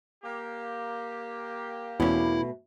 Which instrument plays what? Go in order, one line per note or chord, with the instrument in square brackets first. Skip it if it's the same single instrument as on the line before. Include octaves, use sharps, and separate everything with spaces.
[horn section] A#3 G4
[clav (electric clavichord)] E2 C#4 [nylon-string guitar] B2 A3 [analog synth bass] E4